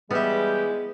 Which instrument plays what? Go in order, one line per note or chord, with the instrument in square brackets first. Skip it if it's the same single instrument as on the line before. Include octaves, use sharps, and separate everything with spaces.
[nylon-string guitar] E3 [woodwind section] G3 G4 [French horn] G#3 [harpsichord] B3 E5